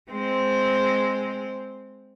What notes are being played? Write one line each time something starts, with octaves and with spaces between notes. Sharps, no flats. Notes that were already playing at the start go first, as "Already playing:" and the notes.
G#3 C4 C5